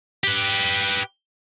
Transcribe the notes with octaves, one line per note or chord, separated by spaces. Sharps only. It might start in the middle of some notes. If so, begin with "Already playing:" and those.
G4 B4